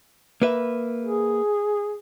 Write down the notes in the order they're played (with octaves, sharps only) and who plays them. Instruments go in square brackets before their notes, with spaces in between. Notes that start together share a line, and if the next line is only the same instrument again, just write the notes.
[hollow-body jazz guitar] A#3 B4 E5
[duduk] G#4